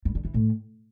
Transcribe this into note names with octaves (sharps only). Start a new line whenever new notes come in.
G2
D3
E3
A2